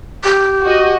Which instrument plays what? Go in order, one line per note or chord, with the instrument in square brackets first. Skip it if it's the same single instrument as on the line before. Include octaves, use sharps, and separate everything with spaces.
[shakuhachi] G4
[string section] F#4 D#5